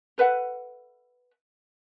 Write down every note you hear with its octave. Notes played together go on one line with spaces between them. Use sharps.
A4 B4 E5 F#5